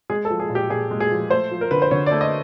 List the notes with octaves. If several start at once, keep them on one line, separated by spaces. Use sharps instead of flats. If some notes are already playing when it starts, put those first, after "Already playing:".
G#3 G#4
A4
F3
G#4
A#2
G4
A#2 G#4
G#3
G#4
F3
A3 C5
F3
A#4
D3 B4
C5
D3 C#5
D5
A3
D#5